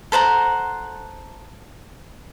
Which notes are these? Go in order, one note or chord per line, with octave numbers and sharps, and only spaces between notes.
A4 C5 F#5 A#5